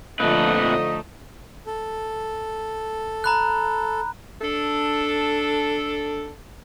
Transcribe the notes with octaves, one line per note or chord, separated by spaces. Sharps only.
F2 A#2 D3 F3 A3 D#4 B4 D#5
A4
A#5 B5 F#6
D4 A4